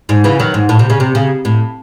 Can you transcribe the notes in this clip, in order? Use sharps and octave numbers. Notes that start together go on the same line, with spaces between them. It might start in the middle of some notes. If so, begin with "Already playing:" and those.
G#2
C#3 E3
D#3 F#3
G#2
A2
C3
C#3
C3
C#3
A2